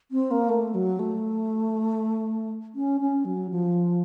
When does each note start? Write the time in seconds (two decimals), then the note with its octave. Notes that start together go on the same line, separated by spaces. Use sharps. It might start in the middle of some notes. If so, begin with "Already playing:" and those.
0.11 C4
0.31 A#3
0.49 A3
0.74 F#3
0.99 A3
2.75 C#4
3.00 C#4
3.25 F#3
3.50 F3